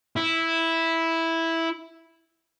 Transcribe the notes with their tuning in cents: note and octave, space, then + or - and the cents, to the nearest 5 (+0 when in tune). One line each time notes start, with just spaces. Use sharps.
E4 -5